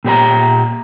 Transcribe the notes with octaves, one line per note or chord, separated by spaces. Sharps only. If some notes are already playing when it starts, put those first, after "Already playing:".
A#2 G4 C5 A#5